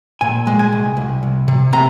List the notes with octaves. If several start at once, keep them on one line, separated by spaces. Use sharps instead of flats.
A#2 G#5
G#3
G#5
C2
C2
C2
C3
C3 A#5